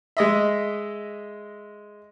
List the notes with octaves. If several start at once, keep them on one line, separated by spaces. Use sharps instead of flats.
G#3 D#5 E5